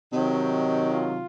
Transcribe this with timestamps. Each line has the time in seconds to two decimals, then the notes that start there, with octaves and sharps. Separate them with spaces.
0.12 C3 D#3 F#3 D#4
0.93 F4